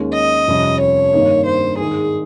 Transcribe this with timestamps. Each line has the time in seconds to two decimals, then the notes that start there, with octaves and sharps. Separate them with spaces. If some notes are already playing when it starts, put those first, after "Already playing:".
Already playing: D#2 D#3 G#3 C#4
0.14 D#5
0.47 F1 F2 C3 G3 C#4
0.80 C#5
1.13 G2 D#3 A#3 D#4
1.46 C5
1.79 G#2 D#3 G#3 D#4 G#4